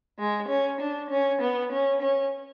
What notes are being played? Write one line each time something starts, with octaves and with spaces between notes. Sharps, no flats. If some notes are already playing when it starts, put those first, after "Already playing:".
G#3
C#4
D4
C#4
B3
C#4
C#4